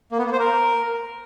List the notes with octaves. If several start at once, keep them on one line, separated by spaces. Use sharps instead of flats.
A#3
B3
A#3
C5
A#4